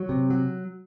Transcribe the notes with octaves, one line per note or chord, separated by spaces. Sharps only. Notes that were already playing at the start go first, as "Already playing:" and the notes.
Already playing: F#3
C3
F#3